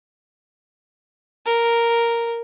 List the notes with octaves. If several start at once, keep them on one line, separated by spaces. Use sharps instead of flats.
A#4